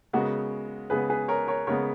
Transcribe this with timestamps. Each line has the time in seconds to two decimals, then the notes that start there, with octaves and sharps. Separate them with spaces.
0.13 C#3 G#3 B3 F#4 A#4
0.90 C#3 G#3 B3 G#4 B4
1.10 G#4 B4
1.28 A#4 C#5
1.48 A#4 C#5
1.67 C#3 G#3 B3 A#4 C#5